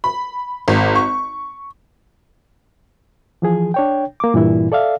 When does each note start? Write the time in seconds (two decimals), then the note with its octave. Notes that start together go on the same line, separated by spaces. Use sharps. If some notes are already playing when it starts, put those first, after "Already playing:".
0.04 B5
0.68 G#1
0.95 C#6
3.42 E3 F3 G#4
3.74 D4 C#5 G5
4.20 A#3 D6
4.34 G2 A#2 E3 E4
4.72 A4 D5 E5 F5